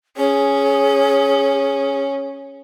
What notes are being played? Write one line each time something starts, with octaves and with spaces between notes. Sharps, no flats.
C#4 G#4